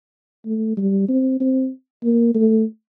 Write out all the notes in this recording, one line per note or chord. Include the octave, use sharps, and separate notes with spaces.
A3
G3
C4
C4
A#3
A3